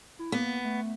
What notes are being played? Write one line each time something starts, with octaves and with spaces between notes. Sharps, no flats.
E4
A#3 B3
A3